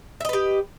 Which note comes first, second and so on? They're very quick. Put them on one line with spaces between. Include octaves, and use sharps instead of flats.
E5 D#5 B4 G4